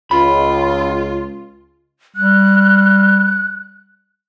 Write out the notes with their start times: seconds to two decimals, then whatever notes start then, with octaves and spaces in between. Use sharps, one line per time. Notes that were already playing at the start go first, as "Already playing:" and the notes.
0.11 C#2 F4 B5
2.16 G3 F#6